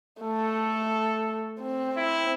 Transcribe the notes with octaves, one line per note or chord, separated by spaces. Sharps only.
A3 A4
C4
E4